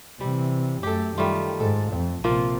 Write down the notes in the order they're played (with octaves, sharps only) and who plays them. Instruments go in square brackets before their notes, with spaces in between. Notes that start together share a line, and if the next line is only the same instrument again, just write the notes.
[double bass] C3 E3 [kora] G3
[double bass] F#2 A3 [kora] G4 A4
[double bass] D#3 [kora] G3 A3 F4
[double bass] G#2 [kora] A4
[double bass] F2
[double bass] A#1 C3 [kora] F3 A#3 F4